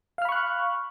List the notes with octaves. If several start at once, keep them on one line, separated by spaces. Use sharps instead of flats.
F5 B5 C#6 F6 F#6